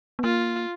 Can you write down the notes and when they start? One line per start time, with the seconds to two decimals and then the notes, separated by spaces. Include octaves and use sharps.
0.19 B3
0.24 A#3 F4